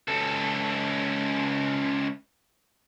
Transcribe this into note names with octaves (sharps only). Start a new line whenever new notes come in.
C#2 A4